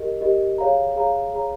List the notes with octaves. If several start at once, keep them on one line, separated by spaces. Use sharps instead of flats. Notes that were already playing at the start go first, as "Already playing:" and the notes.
Already playing: G4 A#4 D#5
G4 A#4 D#5
G#4 C#5 F5 A#5
G#4 C#5 F5 A#5
G#4 C#5 F5 A#5